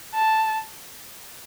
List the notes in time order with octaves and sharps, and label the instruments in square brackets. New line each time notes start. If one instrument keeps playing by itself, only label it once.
[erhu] A5